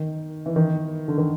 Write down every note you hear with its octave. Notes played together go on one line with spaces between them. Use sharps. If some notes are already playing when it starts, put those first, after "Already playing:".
Already playing: D#3
E3
D#3
D3
D#3